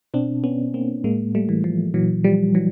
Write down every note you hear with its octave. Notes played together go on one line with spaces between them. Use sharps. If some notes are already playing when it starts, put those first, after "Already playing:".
B2 C4 D4
B3 C#4
A#3 C4
A2 G#3 A#3
G3 A3
E3
F3
A#2 E3 F#3
F3 G3
E3 F#3